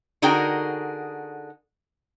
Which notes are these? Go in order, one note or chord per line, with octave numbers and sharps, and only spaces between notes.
D3 D#4 F#4 G#4 A#4 G5